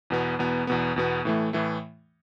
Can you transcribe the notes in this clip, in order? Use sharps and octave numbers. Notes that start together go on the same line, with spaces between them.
E2 B2 B3
E2 B2 B3
E2 B2 B3
E2 B2 B3
A2 E3 A3
A2 E3 A3